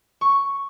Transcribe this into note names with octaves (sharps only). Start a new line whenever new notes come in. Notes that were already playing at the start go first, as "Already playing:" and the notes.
C#6